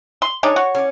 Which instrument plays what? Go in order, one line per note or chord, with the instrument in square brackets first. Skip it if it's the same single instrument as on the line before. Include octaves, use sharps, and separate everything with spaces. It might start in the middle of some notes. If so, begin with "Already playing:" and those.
[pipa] C6
[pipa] G#3 D4 D#4 [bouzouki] C#5
[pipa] F#4
[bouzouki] C#4 D5